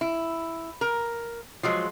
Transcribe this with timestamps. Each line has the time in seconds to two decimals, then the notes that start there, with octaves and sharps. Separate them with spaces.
0.01 E4
0.81 A#4
1.63 F3 F#3 G#3